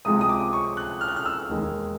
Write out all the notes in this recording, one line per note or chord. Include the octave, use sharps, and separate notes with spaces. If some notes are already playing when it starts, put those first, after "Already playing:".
C#2 C3 F3 G#3 D#6
D#6
D6
C#6
F#6
F6
F#6
F6
E6
E1 D#2 D#3 G#3